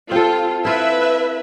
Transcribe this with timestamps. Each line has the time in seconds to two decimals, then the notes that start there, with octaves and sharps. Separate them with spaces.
0.11 C4 F4 A4
0.65 E4 F4 B4 E5